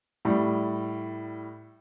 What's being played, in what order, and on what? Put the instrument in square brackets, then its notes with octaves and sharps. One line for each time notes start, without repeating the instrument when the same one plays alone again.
[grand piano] A2 G3